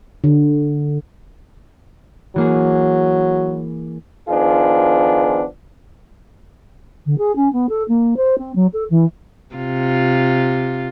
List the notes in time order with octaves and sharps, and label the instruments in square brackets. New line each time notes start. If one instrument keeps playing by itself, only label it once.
[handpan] D3
[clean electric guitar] E3 A#3 G#4 [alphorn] F#3
[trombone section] D#3 F3 B3 D4 F4 G#4
[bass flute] D3
G#4
C#4
B3
A4
A#3
C5
C4
F#3
A4
E3
[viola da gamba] C3 F4